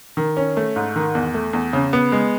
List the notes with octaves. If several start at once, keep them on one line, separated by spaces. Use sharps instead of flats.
D#3
C#4
A3
G#2
D#3
E2
A3
E2
C#3
B3
G#3